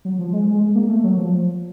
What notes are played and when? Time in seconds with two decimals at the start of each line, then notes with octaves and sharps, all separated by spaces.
0.05 F#3
0.19 F3
0.33 G#3
0.47 G#3
0.61 G#3
0.75 A#3
0.89 A3
1.04 F#3
1.17 F3